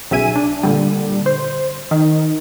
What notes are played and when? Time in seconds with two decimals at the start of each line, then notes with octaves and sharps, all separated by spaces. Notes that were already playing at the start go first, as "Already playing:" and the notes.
0.11 B1 C#3 E5 G#5 D#7
0.36 D4
0.63 A#2 D3 G3
1.26 C5
1.91 D#3